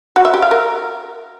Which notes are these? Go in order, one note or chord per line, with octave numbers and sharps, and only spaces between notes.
F#4
E5
G4
F5
A#4